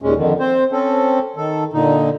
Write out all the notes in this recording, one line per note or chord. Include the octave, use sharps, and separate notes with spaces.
D#2 A#2 G#3 C#4
F2 D3 D#3
C4 C5
C4 C#4 A4
D#3 A4
A#2 D3 D#4